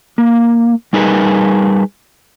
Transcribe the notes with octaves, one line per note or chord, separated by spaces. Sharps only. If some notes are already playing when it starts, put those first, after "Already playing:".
A#3
G3 D#4 G#4 A#4 B4